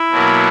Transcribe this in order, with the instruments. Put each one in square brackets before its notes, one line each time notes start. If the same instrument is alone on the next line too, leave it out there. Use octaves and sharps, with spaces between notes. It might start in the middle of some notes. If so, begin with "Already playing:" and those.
Already playing: [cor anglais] E4
[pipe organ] B2 F#3 A#3